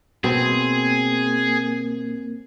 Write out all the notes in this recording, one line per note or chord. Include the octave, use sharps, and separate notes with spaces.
B2 A#3 C4 G#4